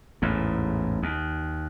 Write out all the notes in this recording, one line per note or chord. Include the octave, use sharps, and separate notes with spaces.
A1 E2 G#2
D#2